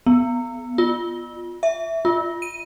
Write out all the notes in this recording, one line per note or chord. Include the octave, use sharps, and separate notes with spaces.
B3
F4
E5
F4
D#7